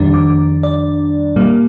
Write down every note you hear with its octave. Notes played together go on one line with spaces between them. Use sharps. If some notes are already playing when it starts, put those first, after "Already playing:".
Already playing: F2 D#3 G3 D4
D6
D5
A#2 G3 A#3